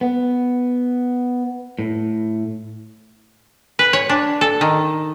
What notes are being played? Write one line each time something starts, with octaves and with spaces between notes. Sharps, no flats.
B3
A2
B4
C#5
D4
A4
D#3